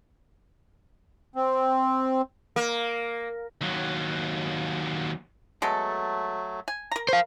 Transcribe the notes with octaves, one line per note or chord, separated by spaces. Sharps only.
C4
A#3
D#2 F#3
F#3 G#3 A3 B3 A4
G#5
A#4 A#5
C5 F5 C#6